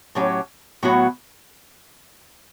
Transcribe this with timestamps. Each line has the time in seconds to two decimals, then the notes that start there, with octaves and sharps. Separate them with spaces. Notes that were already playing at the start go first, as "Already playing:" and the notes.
0.15 A2 F#3 C#4 G4
0.83 A2 F#3 B3 F#4